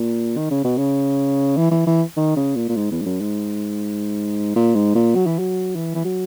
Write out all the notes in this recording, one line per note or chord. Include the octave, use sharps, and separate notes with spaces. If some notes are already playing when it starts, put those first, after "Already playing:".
Already playing: A#2
D#3
C#3
B2
C#3
E3
E3
E3
D#3
C#3
A#2
A#2
G#2
E2
G#2
F#2
G#2
A#2
G#2
A#2
F#3
E3
F#3
E3
E3
F#3